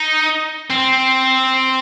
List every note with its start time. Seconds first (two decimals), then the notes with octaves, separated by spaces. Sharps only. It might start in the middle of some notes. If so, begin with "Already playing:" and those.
Already playing: D#4
0.70 C4